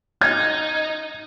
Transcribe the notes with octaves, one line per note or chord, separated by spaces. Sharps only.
D#4 G#6